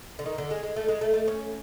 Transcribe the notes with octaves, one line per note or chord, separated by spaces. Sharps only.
D3
D#3
D3
G#3
G#3
A3
G#3
A3
A3
C#4